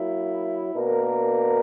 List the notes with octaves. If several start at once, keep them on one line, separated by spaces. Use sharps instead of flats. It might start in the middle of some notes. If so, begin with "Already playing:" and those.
Already playing: F#3 A#3 E4
B2 A#3 D4 A#4